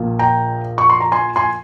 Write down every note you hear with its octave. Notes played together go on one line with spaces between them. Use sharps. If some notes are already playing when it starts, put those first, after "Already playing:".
Already playing: A#1 A#2 F3 A#3
G5 A#5
C#6
C6
A#5
G#5 C6
G#5 C6